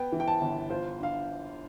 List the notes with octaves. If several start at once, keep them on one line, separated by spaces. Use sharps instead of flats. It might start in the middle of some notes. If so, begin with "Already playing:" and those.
Already playing: B3 G5
E3
G5
A5
G1
F4 C5
D4 F5